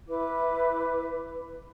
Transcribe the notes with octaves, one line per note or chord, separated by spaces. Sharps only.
E4 B4 D6